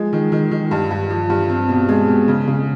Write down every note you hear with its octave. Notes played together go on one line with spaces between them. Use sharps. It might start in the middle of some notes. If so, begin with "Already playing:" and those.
Already playing: F3 G#3
D#3
D#3
D#3
G2
G2
F3
G2
C4
B2
G#3
B2
C#3
C#3